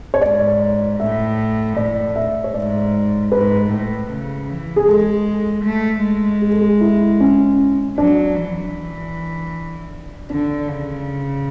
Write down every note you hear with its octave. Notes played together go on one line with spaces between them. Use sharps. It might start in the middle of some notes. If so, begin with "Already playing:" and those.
C#5
G#2 D5
A2 E5
A2 D5
E5
C#5
G#2 D5
G#2 B4
A2
C#3
E3
G#4
G#3 A4
A3
G#3
G#4
A4
G#4
E4
C#4
F#3 D4
E3
D3 D4
C#3